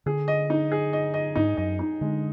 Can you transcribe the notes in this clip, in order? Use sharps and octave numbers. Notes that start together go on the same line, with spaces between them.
D3 G#4
D#5
D#4
G#4
D#5
D#5
G#2 D#4
F#2 D#5
D#4
D3 G#3